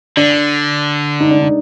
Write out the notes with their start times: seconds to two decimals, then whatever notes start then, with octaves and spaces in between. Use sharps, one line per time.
0.17 D3 D4
1.20 D#4
1.31 D4
1.41 D#4